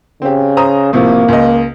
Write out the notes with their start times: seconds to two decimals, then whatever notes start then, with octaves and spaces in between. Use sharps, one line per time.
0.22 C#3 C4 G4
0.57 C5 A#5 D#6
0.93 A2 C3 F3 A#3
1.28 C#2 D#5